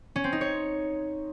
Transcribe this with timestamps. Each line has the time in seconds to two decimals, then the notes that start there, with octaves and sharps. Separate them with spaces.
0.16 C#4
0.24 C4
0.33 D#4
0.41 C#5